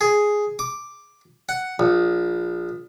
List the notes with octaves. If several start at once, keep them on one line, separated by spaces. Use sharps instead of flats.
G#4
D6
F#5
A#1